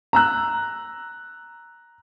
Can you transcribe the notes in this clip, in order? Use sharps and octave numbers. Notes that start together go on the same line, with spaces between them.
A#5 E6 F#6